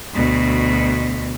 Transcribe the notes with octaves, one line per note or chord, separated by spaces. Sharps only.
D2 B2